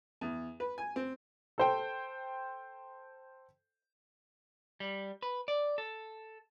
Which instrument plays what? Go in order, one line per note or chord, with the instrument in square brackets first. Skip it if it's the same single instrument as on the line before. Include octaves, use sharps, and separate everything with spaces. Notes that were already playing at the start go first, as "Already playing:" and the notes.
[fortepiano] E2
B4
G#5
C4
[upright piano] A4 C5 G5
[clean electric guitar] G3
B4
D5
A4